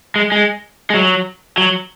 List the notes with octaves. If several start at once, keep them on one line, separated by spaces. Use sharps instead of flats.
G#3
G#3
G#3
F#3
F#3